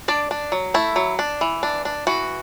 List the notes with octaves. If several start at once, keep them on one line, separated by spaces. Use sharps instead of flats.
D4 D5
D4
F#3
A3 E4
F#3
D4
E3
D4
D4
E3 F#4